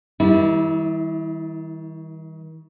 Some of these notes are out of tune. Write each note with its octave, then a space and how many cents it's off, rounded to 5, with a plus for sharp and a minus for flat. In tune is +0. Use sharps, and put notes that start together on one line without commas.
D#3 +40 G3 +0 E4 -20